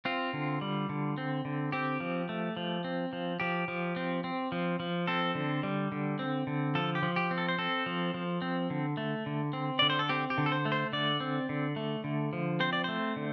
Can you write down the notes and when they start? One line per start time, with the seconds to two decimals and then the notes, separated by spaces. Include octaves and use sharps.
0.05 C4 F4
0.33 D3
0.61 G3
0.89 D3
1.18 C4
1.45 D3
1.72 C4 G4
2.00 F3
2.29 A3
2.57 F3
2.84 C4
3.13 F3
3.40 F3 G4
3.68 F3
3.96 C4
4.24 C4
4.52 F3
4.80 F3
5.07 C4 A4
5.35 D3
5.63 G3
5.92 D3
6.19 C4
6.47 D3
6.75 F3 A4
6.95 G4
7.03 F3
7.16 G4
7.31 C4
7.38 A4
7.49 C5
7.58 C4 A4
7.86 F3
8.14 F3
8.42 C4
8.70 D3
8.97 A3
9.26 D3
9.53 C4
9.79 D3 D5
9.90 C5
9.99 A4
10.09 C4 G4
10.30 G4
10.38 D3
10.46 A4
10.52 C5
10.65 A3
10.72 C5
10.93 D3 D5
11.20 C4
11.49 D3
11.76 A3
12.04 D3
12.33 F3
12.60 C4 C5
12.73 D5
12.84 A3 C5
13.16 D3